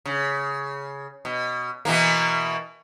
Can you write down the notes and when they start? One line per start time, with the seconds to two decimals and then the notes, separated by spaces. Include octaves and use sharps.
0.06 C#3
1.25 B2
1.85 B2 E3 A#3